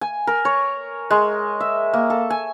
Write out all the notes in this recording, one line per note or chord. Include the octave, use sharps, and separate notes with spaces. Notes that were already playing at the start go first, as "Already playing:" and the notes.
G#5
A#4
C#5
G#3
E5
A#3
A4
G#5